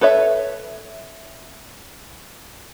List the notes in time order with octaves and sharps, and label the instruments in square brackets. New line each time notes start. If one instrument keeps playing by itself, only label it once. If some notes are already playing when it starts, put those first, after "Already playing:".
[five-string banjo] A4 B4 C#5 E5